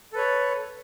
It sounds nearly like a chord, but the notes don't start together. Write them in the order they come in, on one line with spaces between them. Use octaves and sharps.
A4 B4 C#5